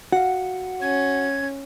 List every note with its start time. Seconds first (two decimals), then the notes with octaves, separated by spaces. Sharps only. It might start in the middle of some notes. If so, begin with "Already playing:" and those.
0.12 F#4 F5 F#5
0.82 C#4 G#6